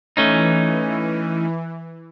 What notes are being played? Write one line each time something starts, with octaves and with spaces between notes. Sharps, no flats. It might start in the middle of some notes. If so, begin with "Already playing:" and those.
E3 A3 C#4 D#4